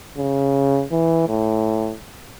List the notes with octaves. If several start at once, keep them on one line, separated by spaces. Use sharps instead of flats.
C#3
E3
A2